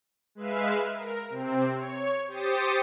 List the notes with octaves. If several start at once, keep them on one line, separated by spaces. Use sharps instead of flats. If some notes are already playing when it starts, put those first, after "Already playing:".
G#3 B4 E5 F5
A#4
C3 C4
C#5
G4 C5 D#6 A6 C#7